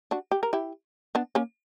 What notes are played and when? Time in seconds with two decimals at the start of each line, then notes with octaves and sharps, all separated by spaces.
0.11 D4 F#4
0.31 G4
0.43 A#4
0.53 E4 G4
1.15 B3 D4
1.35 A#3 C#4